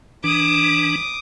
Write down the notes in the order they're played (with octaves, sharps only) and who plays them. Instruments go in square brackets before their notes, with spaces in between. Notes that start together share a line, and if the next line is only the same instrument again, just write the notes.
[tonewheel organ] E3 D4 [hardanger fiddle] D6 D#6